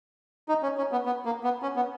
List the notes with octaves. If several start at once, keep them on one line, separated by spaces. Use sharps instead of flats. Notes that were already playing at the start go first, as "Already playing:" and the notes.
D#4
C#4
C#4
B3
B3
A#3
B3
C#4
B3